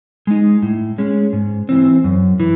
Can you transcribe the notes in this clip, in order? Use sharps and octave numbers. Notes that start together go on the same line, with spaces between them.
G#3 D#4
A2
G#3 C#4
G#2
E3 C4
F#2
E3